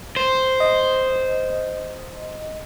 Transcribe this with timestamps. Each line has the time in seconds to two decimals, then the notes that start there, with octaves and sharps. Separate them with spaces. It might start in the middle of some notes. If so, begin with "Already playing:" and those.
0.17 C5
0.60 D#5